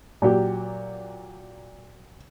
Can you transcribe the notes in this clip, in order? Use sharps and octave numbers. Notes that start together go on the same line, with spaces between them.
A#2 F#3 G4